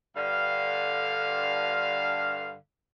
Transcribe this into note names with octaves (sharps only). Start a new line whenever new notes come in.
G2 D3 F5